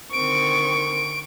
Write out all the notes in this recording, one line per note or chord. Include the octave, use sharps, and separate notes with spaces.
D3 D#3 C4 C#6 D7